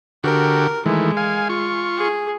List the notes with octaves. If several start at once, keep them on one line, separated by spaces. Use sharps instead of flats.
D3 F#4 G4 A#4
D#3 E3 G#3 A3
F5 G#5
F4 C#6
G#4